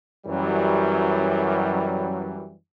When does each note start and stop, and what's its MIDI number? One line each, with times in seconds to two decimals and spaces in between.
0.27 2.54 42
0.27 2.54 52
0.27 2.54 54
0.27 2.54 55